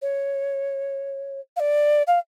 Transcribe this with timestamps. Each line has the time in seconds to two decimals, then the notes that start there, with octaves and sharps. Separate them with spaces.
0.02 C#5
1.56 F5
1.60 D5
2.07 F5